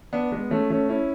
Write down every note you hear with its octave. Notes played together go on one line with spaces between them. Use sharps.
B3 D4
G#3 B3
A3 C#4
A3 C#4
C#4 E4